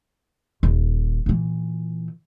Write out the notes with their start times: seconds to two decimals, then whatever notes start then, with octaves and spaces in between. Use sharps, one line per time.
0.63 D#1
1.26 A#2 E3